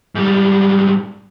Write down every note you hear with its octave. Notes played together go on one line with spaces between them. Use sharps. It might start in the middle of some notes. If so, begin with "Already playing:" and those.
G#2 G3